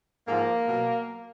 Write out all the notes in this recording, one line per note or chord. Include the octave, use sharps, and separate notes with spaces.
G#2 F3 A#3
B2 F#3